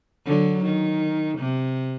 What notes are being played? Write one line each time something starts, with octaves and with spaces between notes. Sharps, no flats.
D3 F#3
D#3
C3